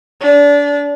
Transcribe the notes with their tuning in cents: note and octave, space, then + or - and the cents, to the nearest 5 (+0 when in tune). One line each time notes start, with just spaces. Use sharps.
D4 -30